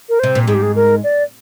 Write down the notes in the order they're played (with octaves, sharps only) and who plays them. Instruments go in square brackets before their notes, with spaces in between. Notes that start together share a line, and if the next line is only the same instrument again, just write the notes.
[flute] A#4
[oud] C3 [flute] C5
[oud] A#2
[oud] G#2 [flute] G#4
[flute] G4
G#4
A#4
D5